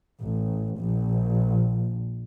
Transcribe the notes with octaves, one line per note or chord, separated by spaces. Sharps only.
A1
A#1